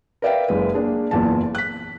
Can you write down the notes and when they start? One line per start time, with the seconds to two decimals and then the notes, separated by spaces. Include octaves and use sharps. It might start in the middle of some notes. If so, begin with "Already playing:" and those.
0.22 A#4 B4 D5 E5 F5 G5
0.48 F#1 G#3 B4
0.74 A#3 D4 G#4
1.11 F#1 E2 A#2 A#3 A5
1.55 F#6 B6